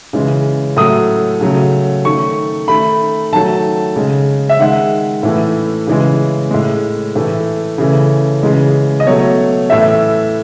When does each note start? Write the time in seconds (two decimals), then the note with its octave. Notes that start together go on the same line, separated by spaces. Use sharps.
0.13 C#3 E3 G#3
0.77 A2 F#3 A3 D#6
1.41 C#3 F#3 A3
2.05 D#3 A3 C#6
2.68 D#3 A3 B5
3.32 D#3 F#3 A3 A5
3.96 C#3 G#3
4.49 E5
4.59 D#3 G#3 F#5
5.23 A2 E3 A3
5.87 C#3 E3 G#3
6.51 A2 G#3
7.15 A2 E3 A3
7.78 C#3 E3 A3
8.43 C#3 E3 G#3
9.00 D#5
9.06 B2 F#3 A3 C#5
9.69 A2 E3 A3 E5